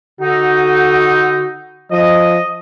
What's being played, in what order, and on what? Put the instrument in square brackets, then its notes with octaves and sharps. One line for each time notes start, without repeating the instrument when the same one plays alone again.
[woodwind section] D3 D#4 [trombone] F#4
[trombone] F3 [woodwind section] D#5